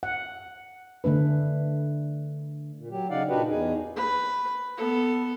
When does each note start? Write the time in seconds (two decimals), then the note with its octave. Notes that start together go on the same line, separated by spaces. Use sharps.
0.03 F#5
1.04 D3 A3 D4 B4
2.78 A#2
2.91 F#3 G4
3.10 C#3 D#4 D5 F5 F#5
3.29 A#2 D4 D#4 F#4 G4 B4
3.49 E2 D#4 G#4
3.96 B4
4.77 B3 A4